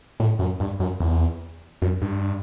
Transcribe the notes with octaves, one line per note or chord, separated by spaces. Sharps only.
A2
F#2
G2
F#2
E2
F#2
G2